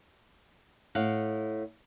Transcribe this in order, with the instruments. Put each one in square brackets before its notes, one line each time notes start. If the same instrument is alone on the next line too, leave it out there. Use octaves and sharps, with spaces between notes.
[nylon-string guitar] A2 F5 F#5